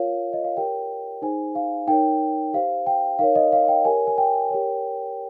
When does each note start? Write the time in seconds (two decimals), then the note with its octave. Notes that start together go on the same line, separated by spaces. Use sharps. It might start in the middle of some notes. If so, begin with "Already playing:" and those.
Already playing: F4 A#4 C#5 F5
0.33 D#5
0.44 F5
0.57 G4 A#4 C#5 G5
1.22 D#4 G#4 C5 G#5
1.55 F5
1.88 D#4 A#4 C#5 G5
2.54 G4 C5 F5
2.87 G5
3.19 D#4 A#4 C#5 F5
3.35 D#5
3.52 F5
3.68 G5
3.85 G4 A#4 C#5 G#5
4.07 G#5
4.18 G5
4.50 G4 A#4 C#5